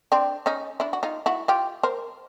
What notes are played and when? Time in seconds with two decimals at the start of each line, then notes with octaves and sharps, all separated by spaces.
0.12 C4 D4
0.46 C#4 D#4
0.80 D4 E4
0.93 F#4
1.03 D#4 F4
1.26 E4 F#4
1.48 F4 G4
1.83 A#4 C5